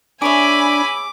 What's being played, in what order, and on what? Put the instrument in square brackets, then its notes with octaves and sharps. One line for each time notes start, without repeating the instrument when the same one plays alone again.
[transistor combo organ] D4 [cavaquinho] G#4 C#5 E5 [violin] G#5 B5 [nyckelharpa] D6